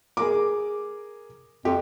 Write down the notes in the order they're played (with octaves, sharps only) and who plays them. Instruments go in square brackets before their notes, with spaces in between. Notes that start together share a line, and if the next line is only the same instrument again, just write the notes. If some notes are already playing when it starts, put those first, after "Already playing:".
[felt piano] G#4 A#4 D6
[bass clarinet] F2 [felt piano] G4